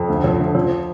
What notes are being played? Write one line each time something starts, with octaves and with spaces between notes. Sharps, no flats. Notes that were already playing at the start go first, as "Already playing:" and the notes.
Already playing: F2
D2
F3
D2
F3